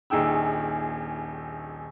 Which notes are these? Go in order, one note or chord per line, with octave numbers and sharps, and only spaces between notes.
D#1 A#1 D#4 G#4 G5 E6